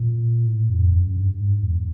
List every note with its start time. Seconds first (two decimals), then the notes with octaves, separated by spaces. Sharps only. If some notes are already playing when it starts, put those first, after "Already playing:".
Already playing: A#2
0.46 A2
0.69 F2
0.93 F#2
1.17 G2
1.40 G#2
1.63 E2